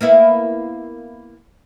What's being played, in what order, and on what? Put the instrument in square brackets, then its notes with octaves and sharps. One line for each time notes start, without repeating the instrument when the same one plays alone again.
[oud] A#3 B3 E4